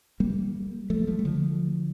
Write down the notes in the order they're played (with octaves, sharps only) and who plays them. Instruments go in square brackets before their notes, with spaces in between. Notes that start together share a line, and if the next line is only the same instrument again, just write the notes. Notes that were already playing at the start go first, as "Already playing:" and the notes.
[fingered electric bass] G3 A#3
F3 A3
F3 A3
G3
D3 F3